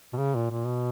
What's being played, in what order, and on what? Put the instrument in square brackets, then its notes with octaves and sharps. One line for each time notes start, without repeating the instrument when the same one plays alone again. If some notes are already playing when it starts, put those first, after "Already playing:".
[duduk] B2
C#3
A#2
A#2
B2